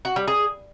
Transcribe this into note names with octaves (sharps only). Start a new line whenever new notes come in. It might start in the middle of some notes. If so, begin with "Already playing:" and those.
F#4
G3
G#4